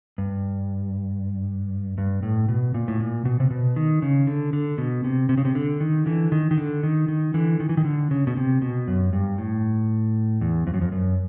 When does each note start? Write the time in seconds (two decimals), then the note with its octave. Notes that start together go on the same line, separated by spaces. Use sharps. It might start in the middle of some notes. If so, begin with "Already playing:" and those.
0.18 G2
1.98 G2
2.23 A2
2.48 B2
2.74 A#2
2.88 A2
3.00 A#2
3.25 B2
3.40 C3
3.50 B2
3.76 D#3
4.02 C#3
4.27 D3
4.53 D3
4.78 B2
5.04 C3
5.29 C3
5.37 C#3
5.45 C3
5.55 D3
5.80 D#3
6.06 D3 E3
6.32 D#3
6.51 D#3
6.58 D3
6.83 D#3
7.08 D#3
7.34 D3 E3
7.60 D#3
7.69 E3
7.77 D#3
7.85 D3
8.11 C#3
8.27 B2
8.37 C3
8.62 B2
8.88 F#2
9.13 G2
9.38 A2
10.41 E2
10.67 F2
10.74 F#2
10.81 F2
10.92 F#2